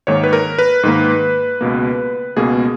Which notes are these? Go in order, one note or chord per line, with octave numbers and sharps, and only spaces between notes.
G#2 D#3 A#3 C#5
B4
A#4
B4
G#2 D#3 A#3
C#2 B2 A#3
C#2 B2 A#3 G#4